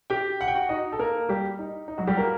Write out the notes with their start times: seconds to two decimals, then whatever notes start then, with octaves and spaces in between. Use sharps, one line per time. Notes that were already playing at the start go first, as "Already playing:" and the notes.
0.10 G4 G5
0.41 F#5
0.48 G5
0.55 F#4 F#5
0.69 D#4 D#5
0.92 A4
0.99 A#3 A#4
1.29 G3 G4
1.59 D#4
1.88 D#4
1.98 F#3 F#4
2.07 G3 G4
2.17 A#3 A#4